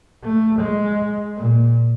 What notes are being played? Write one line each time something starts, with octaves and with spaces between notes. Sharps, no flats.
A3
G#3
A#2